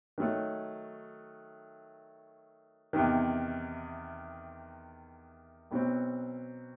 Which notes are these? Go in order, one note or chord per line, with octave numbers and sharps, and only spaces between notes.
D#3 F#3 A3
E2 C3 D#3
B1 B2 F#3 C4